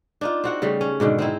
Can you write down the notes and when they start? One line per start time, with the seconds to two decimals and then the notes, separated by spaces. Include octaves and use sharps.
0.21 D4 D#4 F4
0.44 C4 F#4 F#5
0.62 C#3 G3 A3
0.81 C#4
1.00 G#2 B2 D3 D#3
1.18 C4 D#4 E4